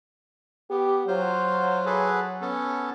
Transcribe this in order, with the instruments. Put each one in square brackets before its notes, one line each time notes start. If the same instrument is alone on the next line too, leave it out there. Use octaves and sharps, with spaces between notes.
[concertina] B3 [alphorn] G4
[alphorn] F#3 [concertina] F4 C5
[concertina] G#4 A4 B4
B3 C#4 A4